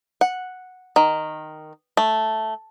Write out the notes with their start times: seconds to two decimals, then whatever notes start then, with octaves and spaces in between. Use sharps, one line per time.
0.21 F#5
0.96 D#3
1.97 A3